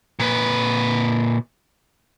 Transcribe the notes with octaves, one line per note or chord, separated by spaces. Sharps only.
A#2 B4